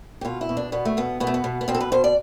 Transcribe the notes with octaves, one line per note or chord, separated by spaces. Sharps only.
G4
B2 F4
E4
B2
D4
B2 B3
A3
B2 B3
B2 B3
A3
B3
B2
B3
B2 C4
A4
B4
B2 C5
D5